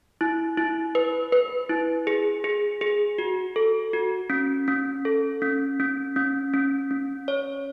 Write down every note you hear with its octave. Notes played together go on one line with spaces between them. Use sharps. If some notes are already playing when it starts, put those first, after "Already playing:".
E4
E4
B4
B4
E4
G#4
G#4
G#4
F#4
A4
F#4
C#4
C#4
A4
C#4
C#4
C#4
C#4
C#4
C#5